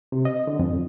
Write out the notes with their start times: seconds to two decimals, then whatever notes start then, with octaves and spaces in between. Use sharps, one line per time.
0.12 C3
0.25 D#5
0.47 D3
0.59 F2